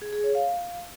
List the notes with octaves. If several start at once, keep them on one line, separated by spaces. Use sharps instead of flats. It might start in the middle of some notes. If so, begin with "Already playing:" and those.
G#4
G#4
C#5
F5